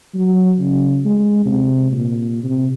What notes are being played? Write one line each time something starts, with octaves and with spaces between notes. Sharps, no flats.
F#3
C#3
G#3
C3
A#2
C3